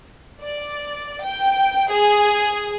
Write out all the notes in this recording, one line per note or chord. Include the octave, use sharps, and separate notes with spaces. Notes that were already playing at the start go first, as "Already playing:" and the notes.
D5
G5
G#4